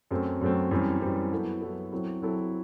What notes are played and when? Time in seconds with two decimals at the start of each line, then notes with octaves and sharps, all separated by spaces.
0.11 F#2 F#3 A3 C4
0.41 F#2 F#3 A3 C4
0.71 F#2 E3 G3 C4
1.01 F#2 E3 G3 C4
1.32 F#3 B3 E4 A4
1.61 F#3 B3 E4 A4
1.92 F#3 C4 E4 A4
2.22 F#3 C4 E4 A4